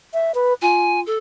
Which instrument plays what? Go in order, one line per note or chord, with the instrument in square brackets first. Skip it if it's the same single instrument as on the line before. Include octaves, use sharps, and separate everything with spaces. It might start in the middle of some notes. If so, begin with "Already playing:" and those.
[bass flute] E5
B4
[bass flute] F4 [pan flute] G#5
[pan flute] A4